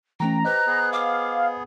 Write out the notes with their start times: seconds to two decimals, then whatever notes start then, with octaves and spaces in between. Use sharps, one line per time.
0.20 E3 A3 C#4 G5 A#5
0.45 G4 B4 C5 D#5 F#6
0.67 B3 G#4
0.93 F5 D6